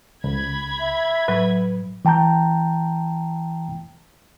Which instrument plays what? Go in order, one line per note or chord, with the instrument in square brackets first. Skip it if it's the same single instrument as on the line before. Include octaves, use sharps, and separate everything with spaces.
[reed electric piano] C#2 [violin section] B5 G#6
[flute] E5
[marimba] A2 F#3 [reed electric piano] B4
[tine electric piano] E3 G5 A5 A#5 G6